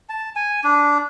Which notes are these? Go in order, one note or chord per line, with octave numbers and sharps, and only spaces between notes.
A5
G#5
D4